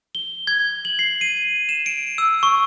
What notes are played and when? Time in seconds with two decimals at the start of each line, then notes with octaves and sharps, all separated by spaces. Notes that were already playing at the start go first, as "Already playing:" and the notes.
0.15 G7
0.47 G#6
0.85 F#7
0.99 C7
1.21 D#7
1.69 E7
1.86 D7
2.18 E6
2.43 C#6